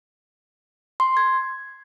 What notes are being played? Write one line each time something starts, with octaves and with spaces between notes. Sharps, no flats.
C6
G#6